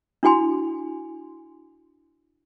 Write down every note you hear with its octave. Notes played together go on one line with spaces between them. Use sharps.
D4 E4 F#4 G#5 C6